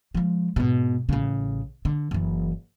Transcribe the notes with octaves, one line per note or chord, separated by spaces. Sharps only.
F3 G#3
G#2 B2
A1 C#3
D3
F#1 E3